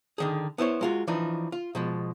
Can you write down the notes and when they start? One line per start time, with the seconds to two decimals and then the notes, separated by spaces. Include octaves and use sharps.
0.18 D3 D#3 G#4
0.58 B3 E4 C5 C#5
0.81 G#3 F4 F#4
1.07 E3 F3 D4 D#4
1.52 F4
1.75 B2 F3 G#3